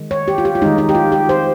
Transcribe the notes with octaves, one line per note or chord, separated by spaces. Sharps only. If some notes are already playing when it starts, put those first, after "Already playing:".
Already playing: D#3 G#3
C#5
G4
F4
G4
F4
D#3 G#3 D#4
D#4
G4
F4
G4
C5